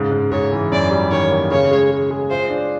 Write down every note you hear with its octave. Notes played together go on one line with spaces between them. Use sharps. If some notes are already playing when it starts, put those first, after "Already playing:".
Already playing: G#2 C#3
G#2
G#2 C#5
E3
F#2 D5
G3
D#3 C#5
A#3
C#3 C#5
G#3
G#3
G#3
F4 C5
D4